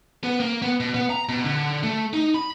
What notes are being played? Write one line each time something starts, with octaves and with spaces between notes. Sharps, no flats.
B3
A#3
B3
B2
B3
A#5
B2
D3
A3
D#4
B5